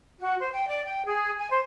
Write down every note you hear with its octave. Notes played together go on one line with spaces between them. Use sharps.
F#4
C5
G5
D5
G5
G#4
G#5
C5